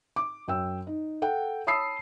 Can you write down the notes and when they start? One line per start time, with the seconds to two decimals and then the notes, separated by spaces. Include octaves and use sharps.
0.16 D6
0.48 F#2 G5 E6
0.87 D#4
1.22 A4 F#5 G5
1.67 C#5 A5 B5 D#6 E6 C7